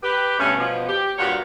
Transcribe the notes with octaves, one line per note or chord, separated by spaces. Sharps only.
G4 B4
G2 B2 A3 C#4
B2 F3
G4
G2 A#2 B3 F#4 G4 C#5